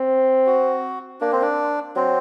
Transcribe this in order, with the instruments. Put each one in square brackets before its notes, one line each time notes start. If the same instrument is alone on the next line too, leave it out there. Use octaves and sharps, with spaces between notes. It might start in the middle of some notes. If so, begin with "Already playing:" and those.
Already playing: [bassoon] C4
[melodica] F#4
[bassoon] A#3 [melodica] D4
[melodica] C4
D4
[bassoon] F#3 [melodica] C4